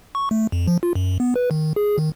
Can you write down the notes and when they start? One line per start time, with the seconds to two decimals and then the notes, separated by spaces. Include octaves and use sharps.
0.15 C#6
0.31 A3
0.52 F2
0.67 F3
0.83 F4
0.95 F#2
1.20 B3
1.36 B4
1.51 D#3
1.76 G#4
1.98 D#3